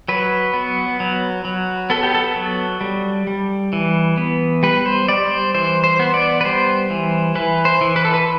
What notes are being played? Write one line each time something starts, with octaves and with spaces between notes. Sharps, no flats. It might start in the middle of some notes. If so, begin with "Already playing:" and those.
F#3 B4
B3
F#3
F#3
B3 A4
G4
A4
F#3
G3
G3
E3
B3
G3 B4
C5
G3 D5
C5
E3 C5
C5
B3
D5
B4
G3 C5
E3
E3 B4
C5
E3
B4
A4
B4